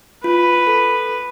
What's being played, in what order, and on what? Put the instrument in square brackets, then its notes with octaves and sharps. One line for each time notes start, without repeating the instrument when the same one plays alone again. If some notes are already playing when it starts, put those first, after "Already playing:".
[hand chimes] F4 [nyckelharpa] B4
[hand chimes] A4